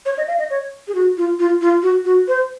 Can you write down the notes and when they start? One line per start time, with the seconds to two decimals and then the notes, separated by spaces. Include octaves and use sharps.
0.06 C#5
0.17 D#5
0.28 F5
0.39 D#5
0.50 C#5
0.88 G#4
0.95 F#4
1.17 F4
1.39 F4
1.61 F4
1.82 F#4
2.05 F#4
2.28 C5